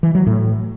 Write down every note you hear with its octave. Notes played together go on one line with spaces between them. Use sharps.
E3
F#3
A2